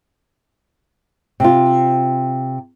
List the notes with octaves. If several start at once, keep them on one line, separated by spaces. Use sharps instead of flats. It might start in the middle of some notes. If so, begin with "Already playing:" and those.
C3 F4